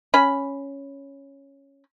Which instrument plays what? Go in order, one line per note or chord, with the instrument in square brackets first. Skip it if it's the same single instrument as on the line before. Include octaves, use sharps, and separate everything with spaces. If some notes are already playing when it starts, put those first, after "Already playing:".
[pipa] C#4 B5